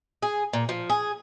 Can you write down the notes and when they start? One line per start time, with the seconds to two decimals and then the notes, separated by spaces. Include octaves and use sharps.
0.22 G#4
0.53 A#2
0.69 F3
0.90 G#4